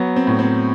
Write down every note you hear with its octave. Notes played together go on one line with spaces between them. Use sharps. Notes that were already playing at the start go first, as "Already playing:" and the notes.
Already playing: F#3 B3
C4
A2
C4